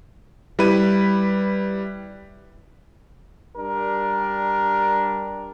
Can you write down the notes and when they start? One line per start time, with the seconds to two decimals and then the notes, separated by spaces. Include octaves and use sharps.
0.59 G3 E4 B4 B5 D#7
3.56 G3 D4 A#4